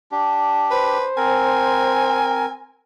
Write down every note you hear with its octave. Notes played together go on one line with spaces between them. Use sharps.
D4 G4
B4 C5
C4 A#4 G#5